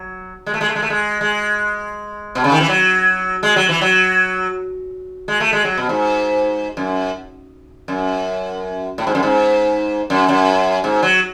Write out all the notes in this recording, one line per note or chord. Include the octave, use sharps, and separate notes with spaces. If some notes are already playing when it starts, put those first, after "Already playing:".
Already playing: F#3
G#3
A3
G#3
A3
G#3
A3
G#3
G#3
B2
C#3
D#3
E3
F#3
G#3
F#3
E3
F#3
G#3
A3
G#3
F#3
B2
G#2
F#2
F#2
A2
G#2
F#2
G#2
F#2
F#2
G#2
F#3